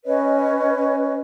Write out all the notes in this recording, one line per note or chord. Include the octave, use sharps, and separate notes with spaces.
C#4 B4 C#5 D#5